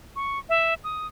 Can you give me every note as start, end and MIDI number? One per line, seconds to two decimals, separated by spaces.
0.16 0.39 85
0.49 0.74 76
0.84 1.07 87